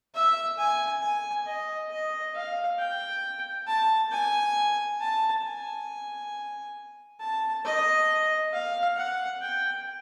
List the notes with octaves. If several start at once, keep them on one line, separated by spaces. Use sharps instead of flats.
E5
G#5
G#5
D#5
D#5
F5
G5
A5
G#5
A5
G#5
A5
D#5
F5
F#5
G5